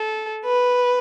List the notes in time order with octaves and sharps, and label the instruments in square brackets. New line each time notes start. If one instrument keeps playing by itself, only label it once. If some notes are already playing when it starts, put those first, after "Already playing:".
Already playing: [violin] A4
B4